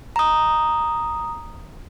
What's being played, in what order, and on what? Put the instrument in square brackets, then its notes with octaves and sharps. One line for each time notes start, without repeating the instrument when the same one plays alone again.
[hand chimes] A#5 D#6